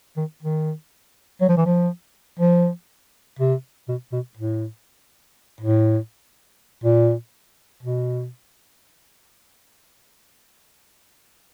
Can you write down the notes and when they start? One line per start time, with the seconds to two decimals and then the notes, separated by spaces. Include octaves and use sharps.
0.17 D#3
0.42 D#3
1.41 F#3
1.49 F3
1.57 E3
1.66 F3
2.39 F3
3.39 C3
3.88 B2
4.12 B2
4.37 A2
5.60 A2
6.84 A#2
7.83 B2